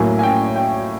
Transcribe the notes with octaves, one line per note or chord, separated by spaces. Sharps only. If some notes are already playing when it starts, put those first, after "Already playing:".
Already playing: A2 F#3 A#3 G#5
G#5
G5
G5